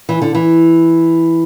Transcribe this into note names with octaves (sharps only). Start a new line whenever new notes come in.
E3
D3
E3